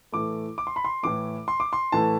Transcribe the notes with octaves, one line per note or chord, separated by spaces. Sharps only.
A2 E3 A3 D6
D6
C6
B5
C6
A2 E3 A3 D6
C6
D6
C6
A2 E3 A3 A5